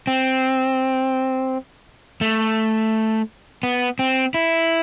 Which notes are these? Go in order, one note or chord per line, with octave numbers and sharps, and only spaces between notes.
C4
A3
B3
C4
E4